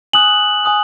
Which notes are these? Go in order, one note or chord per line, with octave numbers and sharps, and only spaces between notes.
G#5 D#6 F#6 F#7
G#5 D#6 F#6